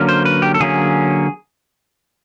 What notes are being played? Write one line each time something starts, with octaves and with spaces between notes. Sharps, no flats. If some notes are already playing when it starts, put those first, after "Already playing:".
Already playing: D3 F#3 A#3 C#4
C5
B4
G4
A4
D3 F#3 A#3 C#4 G#4